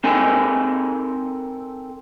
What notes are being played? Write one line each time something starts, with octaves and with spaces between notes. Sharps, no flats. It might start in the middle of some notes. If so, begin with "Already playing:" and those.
C4 D#4 A4 A#4 G#5